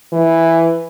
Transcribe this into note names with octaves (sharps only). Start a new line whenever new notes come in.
E3